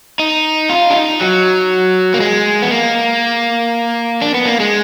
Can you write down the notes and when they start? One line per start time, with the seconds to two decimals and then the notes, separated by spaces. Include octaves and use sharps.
0.19 D#4
0.70 F4
0.90 D4
0.95 D#4
1.21 F#3
2.14 A#3
2.20 G#3
2.62 B3
2.71 A#3
4.22 D4
4.34 B3
4.46 A#3
4.60 G#3